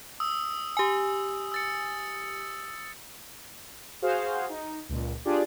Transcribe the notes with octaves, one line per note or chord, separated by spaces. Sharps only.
D#6 E6
G4 G#5
E6 A6 C#7
F#4 G#4 C5 F5
D#4
C#2 A#2
D4 F4 G4 G#4 D5